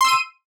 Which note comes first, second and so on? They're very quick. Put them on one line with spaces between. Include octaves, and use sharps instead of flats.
C6 E6 D#7